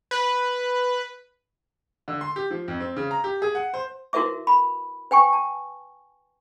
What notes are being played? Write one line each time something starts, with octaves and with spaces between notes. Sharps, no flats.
B4
D3
C6
G4
F3
F2
C4
C#3
A#5
G4
G#4
F#5
C5
E4 F#4 A#4 B4 E5 D6
B5
B4 G5 G#5 C#6
A5